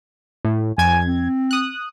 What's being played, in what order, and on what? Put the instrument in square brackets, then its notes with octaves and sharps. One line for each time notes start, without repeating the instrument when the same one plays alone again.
[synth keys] A2
[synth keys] F2 G#6 [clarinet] G#5
[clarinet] C4
[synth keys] D#6 F#6